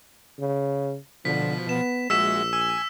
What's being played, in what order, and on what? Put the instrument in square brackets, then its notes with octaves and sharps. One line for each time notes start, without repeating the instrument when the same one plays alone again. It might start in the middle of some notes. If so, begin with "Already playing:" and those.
[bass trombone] C#3
[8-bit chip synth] B2 F3 [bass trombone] D3 [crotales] B6
[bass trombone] B3 [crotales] E7
[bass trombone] A#1 [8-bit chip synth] G#3 F#4 E5 [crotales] E6 B6 E7
[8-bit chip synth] G#5 [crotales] E6